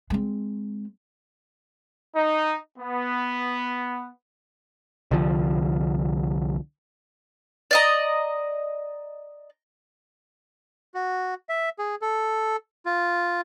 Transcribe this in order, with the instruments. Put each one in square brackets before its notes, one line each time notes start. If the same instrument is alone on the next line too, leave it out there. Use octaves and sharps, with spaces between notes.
[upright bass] G#3 C4
[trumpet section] D#4
B3
[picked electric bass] C2 D3 F3
[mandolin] D5 D#5 A#5
[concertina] F#4
E5
G#4
A4
F4